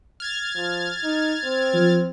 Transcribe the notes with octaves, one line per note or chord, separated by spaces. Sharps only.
F6 G#6 A6
F3
D#4
C4
F3